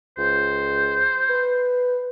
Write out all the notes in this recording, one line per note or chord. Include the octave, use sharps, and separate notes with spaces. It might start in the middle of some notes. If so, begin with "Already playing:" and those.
C#2 C5
B4